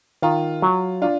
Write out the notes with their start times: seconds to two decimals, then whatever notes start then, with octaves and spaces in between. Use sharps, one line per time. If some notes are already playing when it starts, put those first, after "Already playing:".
0.22 D#3 F4
0.62 F#3
1.02 D4 F4